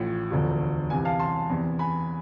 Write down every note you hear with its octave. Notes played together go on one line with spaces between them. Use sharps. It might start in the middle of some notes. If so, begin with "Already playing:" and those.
Already playing: A1 A2 F3
E1 D2 D3 F3
C2 C3 E3 G#5
F5 A5
A5 C6
E2 C3 E3
G#5 B5